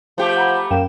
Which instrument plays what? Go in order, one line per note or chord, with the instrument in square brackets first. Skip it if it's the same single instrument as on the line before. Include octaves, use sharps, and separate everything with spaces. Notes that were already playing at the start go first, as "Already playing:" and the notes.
[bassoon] F3 [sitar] A3 G4
[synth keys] F#5 A#5 B5
[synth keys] F#2 G5 E7 [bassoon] A#3